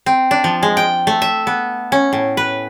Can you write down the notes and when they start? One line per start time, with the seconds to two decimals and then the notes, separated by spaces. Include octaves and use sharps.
0.06 C4
0.31 D4
0.44 F3
0.63 G#3
0.77 G5
1.07 A3
1.22 E5
1.47 B3
1.92 C#4
2.13 A2
2.37 B4